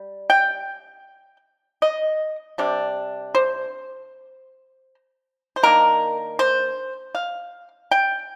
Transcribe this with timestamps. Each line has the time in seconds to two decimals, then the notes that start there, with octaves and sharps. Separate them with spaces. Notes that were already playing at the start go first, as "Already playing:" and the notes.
Already playing: G3
0.30 G5
1.82 D#5
2.58 C3 G3 D4
3.35 C5
5.56 C5
5.63 D#3 A#3 D4 A#4
6.39 C5
7.15 F5
7.91 G5